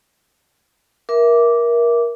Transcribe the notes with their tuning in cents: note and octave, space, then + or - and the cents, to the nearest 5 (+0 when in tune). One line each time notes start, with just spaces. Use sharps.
A#4 +20 E5 +0 D6 -10